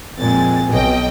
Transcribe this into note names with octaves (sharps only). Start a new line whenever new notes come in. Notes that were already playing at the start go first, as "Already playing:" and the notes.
F2 A#2 G#3 C4 G#5 A6
B1 B2 D#5 G5